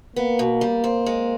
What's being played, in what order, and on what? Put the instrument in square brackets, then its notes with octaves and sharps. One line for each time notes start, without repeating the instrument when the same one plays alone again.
[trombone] A#3 [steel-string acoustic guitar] B3
[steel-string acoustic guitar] B2
G3
C4
G#3